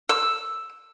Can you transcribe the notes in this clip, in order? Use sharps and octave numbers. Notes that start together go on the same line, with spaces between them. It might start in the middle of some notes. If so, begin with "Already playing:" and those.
E6